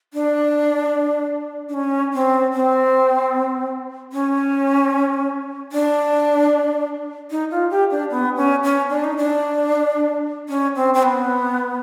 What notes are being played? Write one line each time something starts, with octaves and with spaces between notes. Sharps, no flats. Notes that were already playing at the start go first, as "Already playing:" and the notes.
D4
D4
C#4
C4
C4
C#4
D4
D#4
F4
G4
D4
B3
C#4
C#4
D4
D#4
D4
C#4
C4
C4
B3